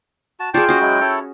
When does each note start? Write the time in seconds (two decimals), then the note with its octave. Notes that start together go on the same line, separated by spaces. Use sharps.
0.40 F#4 A5
0.54 F4 G#4 D5 G5 A5 C#6
0.69 C#4 F#4 D#5
0.81 F#3 G#3 E4
1.01 E4 A4 C#5